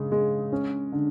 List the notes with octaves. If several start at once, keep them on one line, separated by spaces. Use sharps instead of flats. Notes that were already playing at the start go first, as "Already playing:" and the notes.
Already playing: C#3 G#3
G#3
C#4
D3